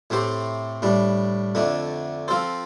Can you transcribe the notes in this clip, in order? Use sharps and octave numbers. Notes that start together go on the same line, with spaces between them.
A2 A3 C4 G4 C5
A2 G3 D4
F2 D3 A3 D4
F3 C4 F4 A4 C5